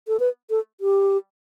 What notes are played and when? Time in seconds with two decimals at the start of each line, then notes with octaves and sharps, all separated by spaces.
0.08 A4
0.20 B4
0.50 A4
0.81 G4